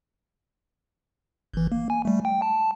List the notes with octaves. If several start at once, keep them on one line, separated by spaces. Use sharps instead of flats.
G1 E3
A#3
G#5
G3 A3
G5
A5